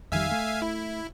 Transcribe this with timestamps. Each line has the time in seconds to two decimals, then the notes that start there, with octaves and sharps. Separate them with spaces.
0.12 F2 D#3 G3 E5 F5 G#5
0.31 A3
0.62 E4